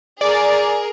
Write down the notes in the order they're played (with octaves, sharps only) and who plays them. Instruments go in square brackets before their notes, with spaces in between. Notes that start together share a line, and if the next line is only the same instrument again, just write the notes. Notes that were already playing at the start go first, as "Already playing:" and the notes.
[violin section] G#4 A#4 [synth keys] D5